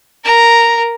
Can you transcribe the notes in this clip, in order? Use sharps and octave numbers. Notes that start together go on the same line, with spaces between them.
A#4 A#5